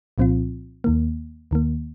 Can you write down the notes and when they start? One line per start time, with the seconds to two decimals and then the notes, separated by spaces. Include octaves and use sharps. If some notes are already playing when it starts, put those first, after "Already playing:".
0.18 C2 A#2 F3 C4 F4
0.84 D#2 D#3 A#3
1.51 D#2 D#3 A#3